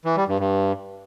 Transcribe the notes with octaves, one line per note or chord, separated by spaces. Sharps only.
E3
G3
G2
G2